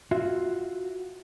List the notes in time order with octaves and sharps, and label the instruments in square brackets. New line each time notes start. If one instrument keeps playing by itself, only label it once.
[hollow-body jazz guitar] F4 F#4 E5